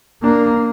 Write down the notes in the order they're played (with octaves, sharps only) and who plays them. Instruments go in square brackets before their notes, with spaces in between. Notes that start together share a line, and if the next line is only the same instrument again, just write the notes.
[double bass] A#3 [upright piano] D4